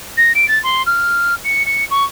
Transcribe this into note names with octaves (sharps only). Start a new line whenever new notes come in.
A#6
D7
A6
C6
F6
C#7
C#7
C#6